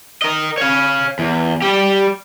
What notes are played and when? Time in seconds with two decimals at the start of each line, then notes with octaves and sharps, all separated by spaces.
0.22 A#4 D#5
0.58 C#5 F5
1.19 E2
1.62 G3 G4